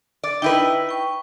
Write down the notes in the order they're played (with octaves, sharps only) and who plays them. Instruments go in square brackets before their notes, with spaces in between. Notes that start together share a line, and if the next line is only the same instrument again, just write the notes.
[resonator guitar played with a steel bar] D5
[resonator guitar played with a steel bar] D#4 E4 B4 [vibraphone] G5 E6
[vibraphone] G5 C#6